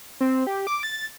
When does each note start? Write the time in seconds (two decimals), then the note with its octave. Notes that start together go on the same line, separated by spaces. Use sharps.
0.21 C4
0.47 G4
0.67 D6
0.83 A6